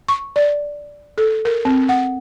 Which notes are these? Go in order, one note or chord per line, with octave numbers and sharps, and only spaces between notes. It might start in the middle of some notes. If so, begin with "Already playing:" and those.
C#6
D5
A4
A#4
C4
F#5